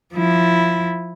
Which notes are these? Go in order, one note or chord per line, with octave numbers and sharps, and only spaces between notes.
F3 E4